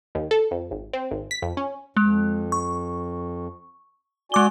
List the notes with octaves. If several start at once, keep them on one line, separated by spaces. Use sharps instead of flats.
D#2
A4
F2
G#1
C4
G#1
B6
F2
C#4
F2 G#3
C#6
G#3 F#4 D5 G#5 D6 G7